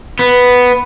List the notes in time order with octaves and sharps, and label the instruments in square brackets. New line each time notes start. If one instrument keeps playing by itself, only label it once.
[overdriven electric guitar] B3